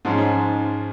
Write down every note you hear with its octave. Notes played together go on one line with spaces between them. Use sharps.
G#2 F3 G#3 C#4 D#4